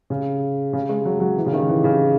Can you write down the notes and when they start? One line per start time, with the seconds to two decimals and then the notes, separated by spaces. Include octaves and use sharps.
0.10 C#3
0.73 C#3
0.89 G#3
1.05 F#3
1.20 F#3
1.37 E3
1.46 C#3
1.53 D#3
1.68 E3
1.84 C#3